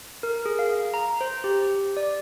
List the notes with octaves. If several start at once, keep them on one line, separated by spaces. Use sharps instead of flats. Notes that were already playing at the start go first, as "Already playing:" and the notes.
A#4
G#4
F5
A#5
C5
G4
D5